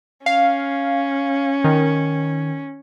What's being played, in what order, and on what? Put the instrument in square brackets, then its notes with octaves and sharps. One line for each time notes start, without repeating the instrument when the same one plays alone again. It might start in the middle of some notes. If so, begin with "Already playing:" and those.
[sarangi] C#4 [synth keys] F5
[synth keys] D#3